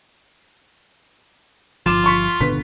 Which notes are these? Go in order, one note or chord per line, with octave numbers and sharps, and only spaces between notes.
G1 F3 F4 D6 E7
C6 C#6 B6
G#1 B2 D3 B4 B6